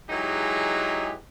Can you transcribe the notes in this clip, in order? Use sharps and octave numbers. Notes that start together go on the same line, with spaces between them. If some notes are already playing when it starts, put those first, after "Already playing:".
E3 F#3 G#3 D#4 G4 G#4